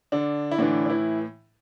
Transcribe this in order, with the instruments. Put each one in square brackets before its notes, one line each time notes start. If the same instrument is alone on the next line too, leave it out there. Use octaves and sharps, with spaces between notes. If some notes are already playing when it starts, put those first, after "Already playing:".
[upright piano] D3 D4
E4
A2 D3 E3 D4
D4
E3 E4